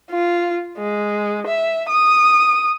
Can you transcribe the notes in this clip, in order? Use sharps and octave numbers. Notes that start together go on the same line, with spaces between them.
F4
G#3
E5
D#6